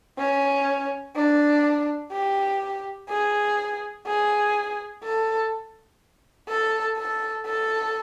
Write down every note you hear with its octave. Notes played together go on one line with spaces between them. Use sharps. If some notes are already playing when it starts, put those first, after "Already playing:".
C#4
D4
G4
G#4
G#4
A4
A4
A4
A4